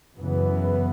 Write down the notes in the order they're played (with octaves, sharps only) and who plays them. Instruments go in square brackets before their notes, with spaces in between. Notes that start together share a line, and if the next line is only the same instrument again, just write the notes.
[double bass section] F#2 C#3 E3 B3